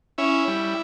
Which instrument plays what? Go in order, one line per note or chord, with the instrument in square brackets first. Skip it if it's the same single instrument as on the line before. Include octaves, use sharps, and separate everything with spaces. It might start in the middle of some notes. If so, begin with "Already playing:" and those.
[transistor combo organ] C#4 E4
G3